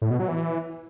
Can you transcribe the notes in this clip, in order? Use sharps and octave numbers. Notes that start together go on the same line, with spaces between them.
A2
B2
F#3
E3